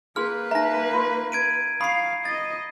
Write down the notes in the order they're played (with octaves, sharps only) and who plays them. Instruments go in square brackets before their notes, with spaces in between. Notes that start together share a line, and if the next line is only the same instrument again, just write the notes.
[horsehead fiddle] A#3 B4 [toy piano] G#4 C6 [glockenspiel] F6
[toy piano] D#4 E5 [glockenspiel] A#5 A#6
[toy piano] F4 C6
[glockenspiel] G#6 D7 D#7
[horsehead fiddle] F5 [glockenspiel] B5 C7 [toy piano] C#6 D#6
[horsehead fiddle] D#5 [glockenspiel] A6